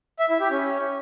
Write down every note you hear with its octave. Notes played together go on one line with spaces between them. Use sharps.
E5
E4
G4
C#4